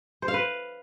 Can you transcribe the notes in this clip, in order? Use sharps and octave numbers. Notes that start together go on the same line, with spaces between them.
C5
F5
B4